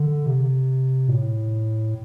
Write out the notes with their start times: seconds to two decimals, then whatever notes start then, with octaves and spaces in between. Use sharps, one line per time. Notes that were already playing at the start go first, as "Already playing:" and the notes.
Already playing: D3
0.26 C3
1.08 A2